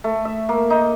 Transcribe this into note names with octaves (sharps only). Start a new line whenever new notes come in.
A3
E5
A#3
D#4